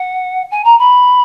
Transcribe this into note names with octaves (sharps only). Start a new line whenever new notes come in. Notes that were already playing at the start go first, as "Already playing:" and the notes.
Already playing: F#5
G#5
A#5
B5